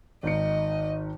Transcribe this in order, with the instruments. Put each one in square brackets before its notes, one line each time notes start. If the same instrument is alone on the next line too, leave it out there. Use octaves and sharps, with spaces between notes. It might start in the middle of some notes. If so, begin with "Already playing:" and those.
[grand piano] G#1 D#3 C#7 [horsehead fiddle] D#5